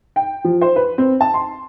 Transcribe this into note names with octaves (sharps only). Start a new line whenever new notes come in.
G5
F3
C5
B4
C4
A5
C6